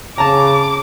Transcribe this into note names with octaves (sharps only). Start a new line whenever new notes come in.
C#3 A5 A#5 D6